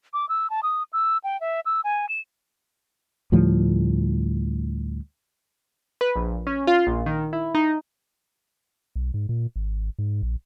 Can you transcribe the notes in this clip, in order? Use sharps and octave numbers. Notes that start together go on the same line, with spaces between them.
D6
E6
A5
D#6
E6
G5
E5
E6
G#5
E7
D2 A2 F3 G3
B4
A#1
C#4
F4
A#1
D#3
E4
D#4
B1
G#2
A#2
G#1
G#2
A#1